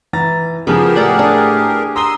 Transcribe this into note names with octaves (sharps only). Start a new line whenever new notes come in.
E3 A#5 A6
C#3 F3 B3 G4 G#4 A#4
A2 A4 D5 F#5
D4
A#5 C6 D#6 E6 G7